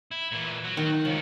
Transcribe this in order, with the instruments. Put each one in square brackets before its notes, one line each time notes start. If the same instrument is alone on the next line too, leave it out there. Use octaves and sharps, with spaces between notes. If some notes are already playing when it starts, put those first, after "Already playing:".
[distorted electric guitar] E4
A#2 E3
F#3 F#4
[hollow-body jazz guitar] D#3
[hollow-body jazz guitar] C#2 [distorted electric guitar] D#3 F3